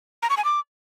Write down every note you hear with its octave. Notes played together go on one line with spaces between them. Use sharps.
A#5
C#6
G#5
D6